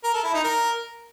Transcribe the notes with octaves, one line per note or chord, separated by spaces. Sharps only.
A#4
A4
E4
D#4
A#4